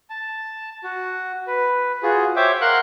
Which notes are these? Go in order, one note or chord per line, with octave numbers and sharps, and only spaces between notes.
A5
F#4
B4
F4 F#4 G#4
C5 C#5 E5 G5 D6
A#4 F5 F#5 C6 F#6